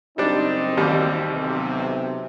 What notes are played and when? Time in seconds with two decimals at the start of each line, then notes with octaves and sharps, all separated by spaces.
0.18 F#1 G3 C4 D4 D#4
0.77 A1 D#2 G3
1.31 B1 C3